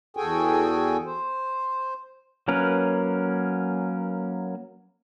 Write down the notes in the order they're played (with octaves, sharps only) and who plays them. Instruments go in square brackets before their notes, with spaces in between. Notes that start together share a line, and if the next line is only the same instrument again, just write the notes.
[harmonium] E2 F#4 G#4 A4 G5 G#5
C5
[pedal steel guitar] F#3 A#3 C#4 A#4 B4